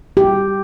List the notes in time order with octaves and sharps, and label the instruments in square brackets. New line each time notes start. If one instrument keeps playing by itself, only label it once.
[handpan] G4